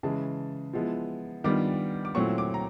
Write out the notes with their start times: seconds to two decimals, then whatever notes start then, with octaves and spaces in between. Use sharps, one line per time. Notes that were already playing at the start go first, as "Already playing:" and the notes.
0.03 C#3 E3 G#3 A5
0.73 F3 G#3 B3 E4
1.44 D#3 G3 B3 D4 F4 D6
2.05 D6
2.15 A#2 F#3 A3 C4 E4 C#6
2.38 D6
2.54 A#5